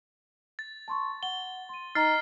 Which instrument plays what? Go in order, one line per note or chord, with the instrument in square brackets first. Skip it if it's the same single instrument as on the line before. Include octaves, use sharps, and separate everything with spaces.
[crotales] A6
[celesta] A5 C6 C#6
[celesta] F#5 [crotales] G7
[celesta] C6 D#7
[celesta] D#4 D#5 A#5 [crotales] F6 A6 C7